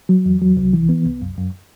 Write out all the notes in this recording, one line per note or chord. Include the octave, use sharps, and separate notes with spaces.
F#3
E2
F#3
C2
E3
B3
C2
F#2
F#2